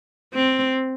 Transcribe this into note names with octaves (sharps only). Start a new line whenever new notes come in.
C4